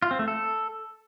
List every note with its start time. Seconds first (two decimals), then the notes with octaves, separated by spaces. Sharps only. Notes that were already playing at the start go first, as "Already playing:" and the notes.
0.02 F4
0.11 C4
0.19 A3
0.28 A4